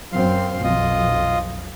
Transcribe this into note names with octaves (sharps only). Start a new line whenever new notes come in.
F#2 C4 F5 C6
B1 F2 F4 D#5